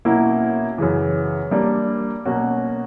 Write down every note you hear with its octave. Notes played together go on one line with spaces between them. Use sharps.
B2 F#3 A#3 C#4 E4
F#2 C#3 E3
G3 A#3 D4
B2 F#3 A#3 C#4 F#4